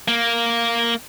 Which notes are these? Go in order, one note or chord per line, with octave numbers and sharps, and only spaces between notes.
A#3